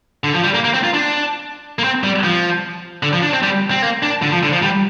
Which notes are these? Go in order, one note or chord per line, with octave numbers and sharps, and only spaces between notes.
D3
F3
G3
A#3
A#3
C4
F4
D4
A#3
C4
G3
F3
D3
F3
D4
C4
G3
C4
A#3
D4
D3
F3
D3
F3
G3